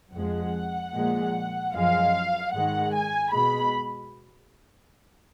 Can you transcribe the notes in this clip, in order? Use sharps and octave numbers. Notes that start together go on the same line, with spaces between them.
F2 F3 G#3 F#5
A#2 F3 G#3
F#2 F3 G#3 F5
G#2 D#3 G#3 F#5
G#5
B2 G#3 B5